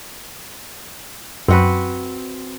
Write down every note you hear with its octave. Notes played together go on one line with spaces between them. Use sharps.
F#2 C4 F#4 B4